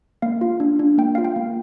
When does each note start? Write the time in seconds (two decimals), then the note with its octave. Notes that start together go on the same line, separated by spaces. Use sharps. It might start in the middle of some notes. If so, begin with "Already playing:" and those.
0.22 A#3 F5
0.41 F4
0.60 D4
0.79 D4
0.98 A#3 G5
1.15 F4 F5
1.24 G5
1.36 A#3